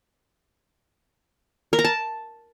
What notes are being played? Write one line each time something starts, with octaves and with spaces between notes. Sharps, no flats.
A#4
A#5
A5